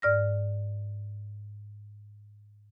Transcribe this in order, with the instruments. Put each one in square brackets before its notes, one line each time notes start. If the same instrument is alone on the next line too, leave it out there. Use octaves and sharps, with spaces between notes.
[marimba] G#2 D5 F6 A#6